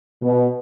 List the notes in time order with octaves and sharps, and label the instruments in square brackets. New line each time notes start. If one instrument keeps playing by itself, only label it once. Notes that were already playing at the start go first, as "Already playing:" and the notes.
[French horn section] B2